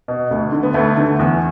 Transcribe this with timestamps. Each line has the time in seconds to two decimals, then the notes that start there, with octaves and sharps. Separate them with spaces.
0.08 B2
0.31 D2
0.52 D3
0.63 B3
0.74 D2 A3
0.97 D3
1.19 E2